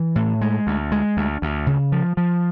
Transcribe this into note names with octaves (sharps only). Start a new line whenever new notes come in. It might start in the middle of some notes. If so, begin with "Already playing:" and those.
Already playing: E3
A2
G#3
D2
G#3
D2
D2
C#3
F3
F3